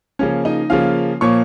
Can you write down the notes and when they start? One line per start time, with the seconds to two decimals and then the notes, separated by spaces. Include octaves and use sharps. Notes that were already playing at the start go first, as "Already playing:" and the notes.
0.19 C#3 F3 A#3 C#4 C#5
0.45 D#4 D#5
0.70 C#3 F3 A#3 C#4 F4 F5
1.21 A#2 F3 A#3 C#5 C#6